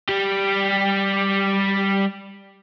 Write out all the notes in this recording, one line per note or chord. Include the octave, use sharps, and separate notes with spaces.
G3 G4